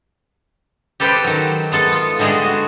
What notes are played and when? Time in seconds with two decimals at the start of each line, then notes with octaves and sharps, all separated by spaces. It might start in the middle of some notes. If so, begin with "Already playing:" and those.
1.00 G4 A4 B4 C5 G5
1.24 D#3 F#3
1.72 G#3 B3 A4
1.92 F4
2.19 A2 D3 G3 G#3 F#4 G#4
2.45 F#4